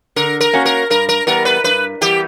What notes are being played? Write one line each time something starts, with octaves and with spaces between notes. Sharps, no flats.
D3 A#4
A#4
A#3 C#4 F#4
A#4
G2 A#4
A#4
E3 G3 B3 A#4
B4
G2 B4
E3 G3 B3 G4